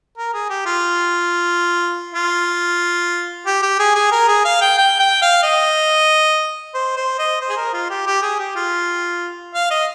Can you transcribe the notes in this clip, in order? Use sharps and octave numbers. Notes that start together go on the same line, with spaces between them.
A#4
G#4
G4
F4
F4
G4
G4
G#4
G#4
A#4
G#4
F5
G5
G5
G5
F5
D#5
C5
C5
D#5
C5
G#4
A#4
F4
G4
G4
G#4
G4
F4
F5
D#5